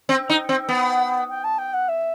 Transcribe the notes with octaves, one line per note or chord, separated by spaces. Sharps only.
C4 G5
D#4
C4
B3
G5
A5
G5
F#5
E5